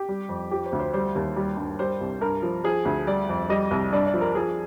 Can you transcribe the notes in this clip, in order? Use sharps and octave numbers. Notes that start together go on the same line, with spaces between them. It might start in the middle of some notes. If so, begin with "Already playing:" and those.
Already playing: G4
G3
F2
F3 G4
C5
D2
C5
G3 C5
D#2
G3
G2
G3 C5
C2
G2 A#4
F3
F3 G#4
D2
G3 D5
F2
G3 D#5
C2
G2 D5
D5
F3
A#4
F3 G#4